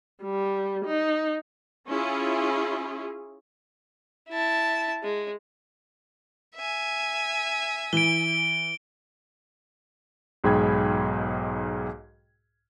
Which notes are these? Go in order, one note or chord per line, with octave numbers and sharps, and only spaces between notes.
G3
D#4
C#4 E4 F4 G#4
E4 A5
G#3
E5 G#5
E3 D7 G7
B1 G#2 G#4 G5 B5 G#6